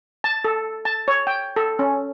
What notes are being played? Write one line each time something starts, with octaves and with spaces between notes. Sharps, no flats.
A5
A4
A5
C#5
G5
A4
C#4